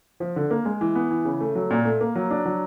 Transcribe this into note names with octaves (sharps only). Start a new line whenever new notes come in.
F3
D3
A#3
G#3
E3
B3
E3
C#3
A3
F#3
A#2
A3
A#3
F#3
D4
F#3